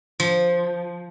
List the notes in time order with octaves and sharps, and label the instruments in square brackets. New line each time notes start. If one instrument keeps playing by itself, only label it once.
[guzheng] F3